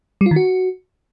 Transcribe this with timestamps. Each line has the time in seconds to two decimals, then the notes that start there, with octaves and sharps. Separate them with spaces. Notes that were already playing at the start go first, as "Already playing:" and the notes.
0.21 G3
0.26 F4
0.31 D#3
0.36 F#4